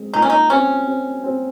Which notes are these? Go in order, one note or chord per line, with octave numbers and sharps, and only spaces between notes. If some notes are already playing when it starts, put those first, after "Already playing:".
Already playing: G#3 C4
A#2 D#4
C#4
D#4
C4 C#4
C4
C4